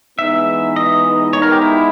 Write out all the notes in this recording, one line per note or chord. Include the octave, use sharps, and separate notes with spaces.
E3 G#3 B3 D#4 E5
D#5
G#3 B3 D#4 C#5
A#4
G4
E4